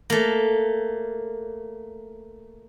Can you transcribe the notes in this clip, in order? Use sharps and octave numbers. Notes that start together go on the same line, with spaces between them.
A3 A#3